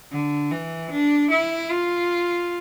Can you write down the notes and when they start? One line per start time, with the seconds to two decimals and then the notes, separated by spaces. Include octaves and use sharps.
0.12 D3
0.51 E3
0.91 D4
1.30 E4
1.71 F4